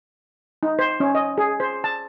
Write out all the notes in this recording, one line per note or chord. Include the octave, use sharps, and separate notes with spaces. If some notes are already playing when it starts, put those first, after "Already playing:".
D#4
C5
C#4
D#5
G#4
C5
A5